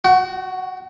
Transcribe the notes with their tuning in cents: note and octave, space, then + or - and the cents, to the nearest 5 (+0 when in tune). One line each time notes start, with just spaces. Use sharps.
F#4 +0 F#5 +45